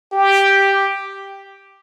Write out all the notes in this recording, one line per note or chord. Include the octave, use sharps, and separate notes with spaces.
G4